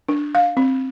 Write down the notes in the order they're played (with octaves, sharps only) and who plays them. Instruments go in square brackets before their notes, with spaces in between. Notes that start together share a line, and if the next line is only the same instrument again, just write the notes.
[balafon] D4
F5
C4